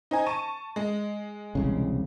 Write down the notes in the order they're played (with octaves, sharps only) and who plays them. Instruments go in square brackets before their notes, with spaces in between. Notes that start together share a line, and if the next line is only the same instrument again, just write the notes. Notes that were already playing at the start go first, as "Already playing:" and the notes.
[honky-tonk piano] D#4 C5 G#5
A5 C#6 D#7
G#3
[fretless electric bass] E1 C2 C#3